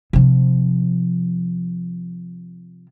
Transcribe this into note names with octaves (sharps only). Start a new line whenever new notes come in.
C3 F3